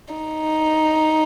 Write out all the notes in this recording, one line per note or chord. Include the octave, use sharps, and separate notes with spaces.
D#4